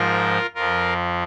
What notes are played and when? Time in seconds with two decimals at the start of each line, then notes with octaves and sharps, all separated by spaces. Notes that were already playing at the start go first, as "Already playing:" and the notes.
Already playing: G#2 F3 F4 A#4
0.55 F2 F3 F4 A#4